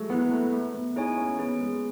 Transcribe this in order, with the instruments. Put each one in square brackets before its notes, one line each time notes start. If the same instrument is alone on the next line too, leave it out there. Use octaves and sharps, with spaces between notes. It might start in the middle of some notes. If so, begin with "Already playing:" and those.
Already playing: [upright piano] F#3 G#3 A3
[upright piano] B3 [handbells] E4 B4 F#5
[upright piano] A3
[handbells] A3
[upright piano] B3
[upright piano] D#4 [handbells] E4 G#4 C#5 G#5
[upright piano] C#4
[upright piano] B3 [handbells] G#4
[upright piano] G#3